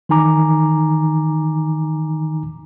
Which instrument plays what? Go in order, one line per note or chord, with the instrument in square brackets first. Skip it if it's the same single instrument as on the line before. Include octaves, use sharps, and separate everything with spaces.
[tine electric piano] D#3 E3 D#4 G#5 A#5 D6